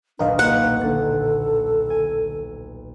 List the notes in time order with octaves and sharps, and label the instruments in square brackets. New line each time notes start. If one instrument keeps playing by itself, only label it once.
[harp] D#1 B1 [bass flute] D4 [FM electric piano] A#4 D#5 F5
[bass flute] A#3 [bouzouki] F#5
[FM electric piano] A#2 D3 [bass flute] A4 [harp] A6
[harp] G#5